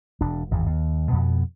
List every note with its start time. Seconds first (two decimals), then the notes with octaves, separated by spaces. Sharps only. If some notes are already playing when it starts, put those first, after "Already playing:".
0.21 E1 D4
0.51 G#1 E2 G2
0.66 D#2
1.10 F2 B2 B3